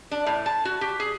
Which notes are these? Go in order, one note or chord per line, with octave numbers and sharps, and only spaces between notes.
D4
A2
A5
F#4
G4
G#4